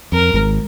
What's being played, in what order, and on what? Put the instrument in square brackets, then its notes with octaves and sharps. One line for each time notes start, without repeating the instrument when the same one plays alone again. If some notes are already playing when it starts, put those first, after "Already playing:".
[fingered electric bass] F2 [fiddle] A#4
[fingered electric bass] G#1 G#2